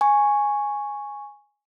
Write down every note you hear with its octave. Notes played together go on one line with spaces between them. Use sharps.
G#5 C#6